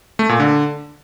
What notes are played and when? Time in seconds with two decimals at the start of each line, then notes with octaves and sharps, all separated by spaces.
0.19 A3
0.29 A#2
0.40 D3